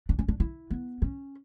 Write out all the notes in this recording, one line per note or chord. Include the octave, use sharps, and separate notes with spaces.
D4
C#4
D4
E4
B3
C#4